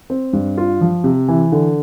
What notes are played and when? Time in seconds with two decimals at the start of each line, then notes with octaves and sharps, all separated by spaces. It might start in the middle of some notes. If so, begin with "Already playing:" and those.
0.10 C4
0.33 G2
0.58 F4
0.81 F3
1.04 C3
1.28 E3
1.52 D3